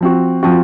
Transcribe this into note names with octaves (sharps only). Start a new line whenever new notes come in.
F3 C4 F#4
F3 C4 F#4